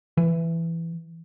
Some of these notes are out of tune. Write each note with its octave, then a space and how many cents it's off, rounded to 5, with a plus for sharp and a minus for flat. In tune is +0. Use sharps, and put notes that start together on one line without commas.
E3 +10